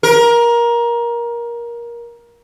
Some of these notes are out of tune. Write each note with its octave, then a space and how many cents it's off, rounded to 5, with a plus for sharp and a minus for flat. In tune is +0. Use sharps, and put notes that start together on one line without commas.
A#4 +20